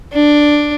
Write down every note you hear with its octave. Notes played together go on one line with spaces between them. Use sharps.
D4